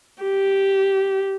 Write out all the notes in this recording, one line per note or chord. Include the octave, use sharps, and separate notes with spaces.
G4